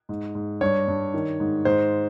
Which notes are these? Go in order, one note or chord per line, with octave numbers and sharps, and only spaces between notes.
G#2
G#2
G2 C#5
G2
D#3
G#2
G#2 C5